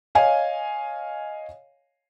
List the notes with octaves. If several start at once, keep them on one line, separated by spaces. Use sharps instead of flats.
C#5 D#5 F5 G#5